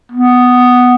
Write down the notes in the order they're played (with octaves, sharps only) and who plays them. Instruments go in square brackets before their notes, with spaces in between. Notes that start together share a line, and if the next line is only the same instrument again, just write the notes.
[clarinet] B3